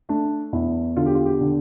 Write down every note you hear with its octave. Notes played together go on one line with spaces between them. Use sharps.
A3 D4
E2 E4
D3 F4
G4
F4
G4
D3